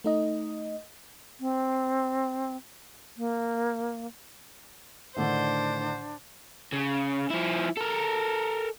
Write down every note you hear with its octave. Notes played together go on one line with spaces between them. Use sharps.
A3 D#4 D#5
C4
A#3
A2 D3 D#3 D4 C5
C#3
F3 E4
A4 A#4